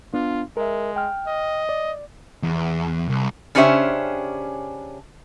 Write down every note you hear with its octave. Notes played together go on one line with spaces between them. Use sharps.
B3 D4 F4
G#3 A#4 E5
G5 F6
D#5
D5
E2
C2
C#3 C#4 D4 G4 C5 E5